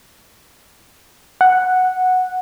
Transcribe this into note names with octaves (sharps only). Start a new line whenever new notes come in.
F#5